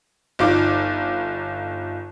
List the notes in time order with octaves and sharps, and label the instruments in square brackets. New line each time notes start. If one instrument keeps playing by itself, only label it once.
[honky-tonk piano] G1 D#4 F4 D6